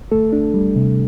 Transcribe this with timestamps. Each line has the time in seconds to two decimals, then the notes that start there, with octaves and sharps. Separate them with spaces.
0.12 D2 A3 A4
0.33 D4
0.54 G3
0.76 C3